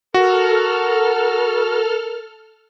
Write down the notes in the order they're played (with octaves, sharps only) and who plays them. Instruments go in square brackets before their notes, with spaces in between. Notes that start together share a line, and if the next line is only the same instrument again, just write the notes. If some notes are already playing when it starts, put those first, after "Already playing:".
[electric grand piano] F#4 [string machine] A4 F6 [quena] A#4